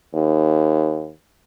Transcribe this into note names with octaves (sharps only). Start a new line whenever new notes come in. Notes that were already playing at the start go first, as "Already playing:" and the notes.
D#2